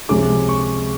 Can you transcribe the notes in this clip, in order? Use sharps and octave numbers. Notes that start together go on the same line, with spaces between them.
C#2 C3 F3 G#3 C#4 D6
C#6